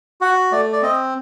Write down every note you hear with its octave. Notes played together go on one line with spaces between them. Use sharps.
F#4 F#5
A3 D5
D5
C4 D#5